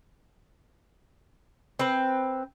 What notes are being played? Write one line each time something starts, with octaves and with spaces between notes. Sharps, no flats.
C4 B4